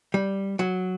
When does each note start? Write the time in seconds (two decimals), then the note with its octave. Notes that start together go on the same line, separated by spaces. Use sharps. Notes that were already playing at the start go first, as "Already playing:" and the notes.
0.14 G3
0.59 F#3